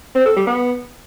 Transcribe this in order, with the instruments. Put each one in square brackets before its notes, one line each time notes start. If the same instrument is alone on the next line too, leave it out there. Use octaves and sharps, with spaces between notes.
[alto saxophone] C4
A4
G3
B3